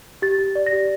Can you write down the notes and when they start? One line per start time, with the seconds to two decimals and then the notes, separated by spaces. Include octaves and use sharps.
0.22 G4 A6
0.38 G4
0.55 D5
0.66 A#6
0.72 G4